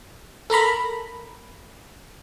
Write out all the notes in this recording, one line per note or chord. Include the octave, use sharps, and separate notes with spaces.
A4 A#4 A#5 B5